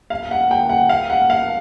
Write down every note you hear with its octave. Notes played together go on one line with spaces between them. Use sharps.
F5
F#5
G5
F#5
F5
F#5
F5